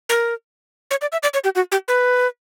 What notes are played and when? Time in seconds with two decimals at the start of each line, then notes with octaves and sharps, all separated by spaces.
0.09 A#4
0.91 C#5
1.01 D5
1.12 E5
1.23 D5
1.34 C#5
1.44 G4
1.55 F#4
1.72 G4
1.88 B4